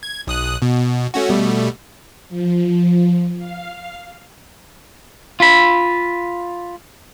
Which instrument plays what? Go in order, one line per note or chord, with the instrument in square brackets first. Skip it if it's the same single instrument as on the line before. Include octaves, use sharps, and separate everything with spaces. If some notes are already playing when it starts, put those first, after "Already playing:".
[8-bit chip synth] G#6
B1 D#6 F#6
B2
A3 C#4 F#4
B2 G3 A3
[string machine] F3
F5
[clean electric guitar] F4 B5